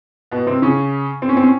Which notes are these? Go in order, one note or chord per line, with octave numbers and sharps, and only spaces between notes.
B2 B3
C3 C4
C#3 C#4
C4
C#4
C4
C#4